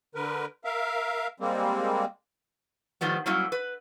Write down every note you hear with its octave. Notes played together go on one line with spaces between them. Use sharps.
D3 A#4 B4
A#4 E5 F5
G3 G#3 A#3 C4
A2 D#3 F3 G3 B3
F#3 G3 A#3 C#4 E4
B4